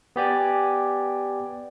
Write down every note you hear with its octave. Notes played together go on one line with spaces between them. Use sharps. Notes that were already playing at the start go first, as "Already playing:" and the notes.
B3 G4 D5 G#5